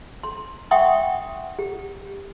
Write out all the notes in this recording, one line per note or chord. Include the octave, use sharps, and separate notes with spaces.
C6
E5 F#5 G5 C6 C#6 D#6
G4